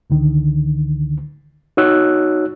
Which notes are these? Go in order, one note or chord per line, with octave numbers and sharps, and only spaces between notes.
C#2 D3 D#3
D#4 F#4 C#5 E6 F#6